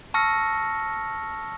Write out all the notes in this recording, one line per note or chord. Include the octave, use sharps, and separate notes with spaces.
A5 C#6 E6 F6 A#6 C#7